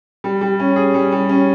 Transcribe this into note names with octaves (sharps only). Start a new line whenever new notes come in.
G3
G3
C#4
G#4
G3
G3
C#4